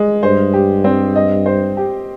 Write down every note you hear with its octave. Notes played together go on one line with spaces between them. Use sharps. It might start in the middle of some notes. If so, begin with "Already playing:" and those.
Already playing: G#3
G2 C5
G4
C4
D#5
C5
G4